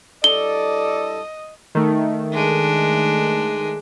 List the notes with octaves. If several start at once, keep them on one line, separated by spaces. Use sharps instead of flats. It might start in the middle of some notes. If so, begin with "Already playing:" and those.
G2 E4 A4 D5 D#5 G7
D#3 A3
G#3 D4